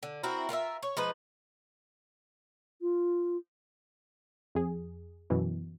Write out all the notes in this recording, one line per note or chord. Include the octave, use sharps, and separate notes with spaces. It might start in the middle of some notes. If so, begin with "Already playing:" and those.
D3
C4 E4 F#4 A#4
F4 A#4 C#5 E5
C#5
F3 G#3 D#4 B4
F4
F2 G#4
F#2 B2 E3